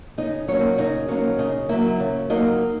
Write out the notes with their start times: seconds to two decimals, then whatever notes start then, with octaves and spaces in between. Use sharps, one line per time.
0.18 C#3 D#4 D#5
0.48 F#3 A#3 C#4 C#5
0.78 C#3 D#4 D#5
1.08 F#3 A#3 C#4 C#5
1.39 C#3 D#4 D#5
1.69 F#3 A#3 E4 E5
1.99 C#3
2.30 F#3 A#3 D#4 D#5